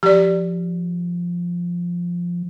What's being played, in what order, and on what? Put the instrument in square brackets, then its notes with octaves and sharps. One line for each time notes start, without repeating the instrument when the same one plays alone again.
[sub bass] F3 [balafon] G4 D5